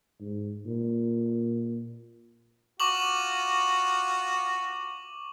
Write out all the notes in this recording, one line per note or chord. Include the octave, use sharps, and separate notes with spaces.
G#2
A#2
F4 F#4 C#6 D6 F#7